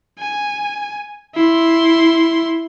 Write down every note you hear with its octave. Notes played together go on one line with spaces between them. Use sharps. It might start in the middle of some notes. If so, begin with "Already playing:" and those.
G#5
E4 C6